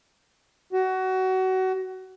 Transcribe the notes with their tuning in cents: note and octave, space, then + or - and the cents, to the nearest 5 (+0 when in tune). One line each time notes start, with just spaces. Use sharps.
F#4 +25